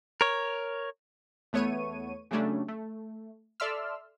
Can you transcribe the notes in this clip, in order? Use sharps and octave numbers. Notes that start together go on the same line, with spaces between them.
A#4 C#5
E2 A3 B3 C#5 C#6 D#7
C#3 F#3 G3 A3 C#4 D4
A3
A4 D5 E5 C6 E6 F6